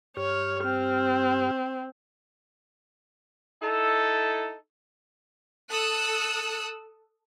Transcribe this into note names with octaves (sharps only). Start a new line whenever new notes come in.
G2 G4 C#5 F6
C4
D#4 E4 A4
A4 D#6 E6 F#6